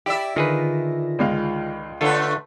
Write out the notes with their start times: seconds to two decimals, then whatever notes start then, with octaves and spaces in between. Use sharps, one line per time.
0.06 E4 G4 D5 E5
0.36 D3 D#3 F4 G#4 B4 A#6
1.19 C#2 G#3 F5
2.01 D3 A3 F4 A4 B4 C#5